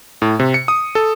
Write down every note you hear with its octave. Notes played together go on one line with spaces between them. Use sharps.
A2
C3
C#7
D#6
A4